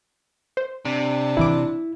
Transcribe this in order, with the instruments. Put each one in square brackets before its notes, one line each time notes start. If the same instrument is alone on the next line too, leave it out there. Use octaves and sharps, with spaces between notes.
[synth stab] C5
[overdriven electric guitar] C3 [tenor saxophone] D4
[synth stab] G#1 E3 D6 [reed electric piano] E4